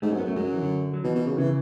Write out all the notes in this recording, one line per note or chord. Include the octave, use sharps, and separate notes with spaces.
G#2 A3
C#4
F#2
B3
F#2
A3
F#2 G#3
F#3
E3
D3
F#3
B2 E3
B2
C#3
C#3 E3